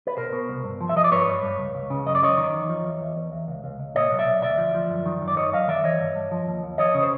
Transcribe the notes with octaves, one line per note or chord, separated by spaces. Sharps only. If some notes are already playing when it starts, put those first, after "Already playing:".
B4
B2 A#4 C5
B2
C2
G2
F3
E5
F3 D#5
D5
G2 B4 C#5
G2
G2
C#2
C#2
C#3
F#2 D#5
D5
F#2 C#5 D#5
D#3
E2
F3
E2
E2
E2
E2
C#2
C#2
C#2
A#2 C#5 D#5
B1
D5 E5
B1
D2 D5 E5
F3
F3
F#2
D#3
F#2
D5
F#2 C#5 D#5
F#2 D#5 F5
D#3 D5 E5
E3 C#5 D#5
G2
G2
F3
D#2
D#2
F2 C#5 D#5
C#3
C5